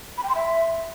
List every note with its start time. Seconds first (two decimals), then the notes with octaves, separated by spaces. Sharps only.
0.18 B5
0.24 G5
0.29 C6
0.35 E5